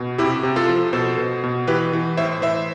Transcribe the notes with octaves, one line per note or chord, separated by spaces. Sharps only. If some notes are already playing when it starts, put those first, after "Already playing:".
Already playing: B2
C3 E4 G4
C3
F4 A4
F3
B2 A4 C5
B2
B2
E3 G4 B4
E3
A2 C5 E5
E3 C5 E5